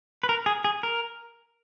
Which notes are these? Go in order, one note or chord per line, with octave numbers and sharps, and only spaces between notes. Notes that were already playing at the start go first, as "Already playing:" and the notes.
B4
A#4
G#4
G#4
A#4